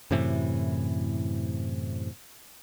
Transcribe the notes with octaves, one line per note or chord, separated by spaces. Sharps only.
F#2 A2 C3 E3